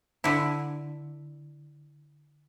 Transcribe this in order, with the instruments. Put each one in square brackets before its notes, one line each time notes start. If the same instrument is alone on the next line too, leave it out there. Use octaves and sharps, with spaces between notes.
[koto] D3 E4